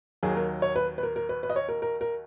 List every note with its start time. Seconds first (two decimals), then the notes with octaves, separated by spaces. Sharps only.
0.23 D#2 D#3 F#3 G#4
0.37 A#4
0.62 C#5
0.76 B4
0.98 B4
1.03 A#4
1.16 A#4
1.29 B4
1.43 B4
1.50 D#5
1.56 C#5
1.69 A#4
1.82 A#4
2.01 A#4